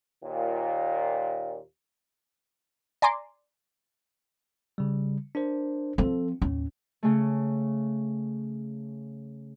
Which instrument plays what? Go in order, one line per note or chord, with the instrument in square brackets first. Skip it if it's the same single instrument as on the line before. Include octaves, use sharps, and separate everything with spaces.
[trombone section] D#2 A#2
[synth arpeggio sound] D5 G#5 A#5 C6 D6
[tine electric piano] C#3 G3
D4 A#4 C5
[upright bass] F3 C4 [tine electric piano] A4
[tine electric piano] D#2 A2 [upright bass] C#4
[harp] C#3 A3